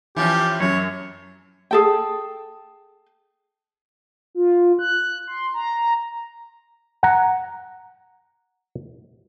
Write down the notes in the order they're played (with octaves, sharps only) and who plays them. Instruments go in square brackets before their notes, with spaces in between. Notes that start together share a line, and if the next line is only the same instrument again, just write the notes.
[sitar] E3 F3 C#4 [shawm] G4
[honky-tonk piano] F#2 [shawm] C#5
[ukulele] G#4 A4 G5
[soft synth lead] F4
F#6
C6
A#5
[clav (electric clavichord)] F#5 A#5